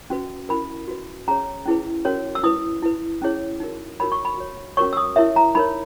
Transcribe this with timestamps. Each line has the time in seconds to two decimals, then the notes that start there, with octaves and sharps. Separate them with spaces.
0.10 C#4 F#4 B4
0.49 C#4 E4 A#4 B5
0.88 F#4 B4
1.28 C#4 G#4 C#5 A#5
1.66 C#4 E4 G#4 B4
2.05 C#4 F#4 A#4 C#5
2.35 E6
2.43 E4 B4 D#6
2.82 E4 B4
3.22 C#4 E4 G#4 C#5
3.60 D#4 F#4 A#4
4.00 D#4 F#4 A#4 C#5 B5
4.12 C#6
4.25 B5
4.38 F#4 C#5
4.77 C#4 F#4 A#4 C#5 C#6
4.93 E6
4.97 D#6
5.16 E4 A#4 C#5 E5
5.36 A#5
5.55 D#4 A#4 C#5 B5